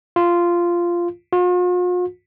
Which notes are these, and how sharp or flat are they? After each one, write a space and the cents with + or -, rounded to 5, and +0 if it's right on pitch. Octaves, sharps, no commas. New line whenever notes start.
F4 -10
F4 +45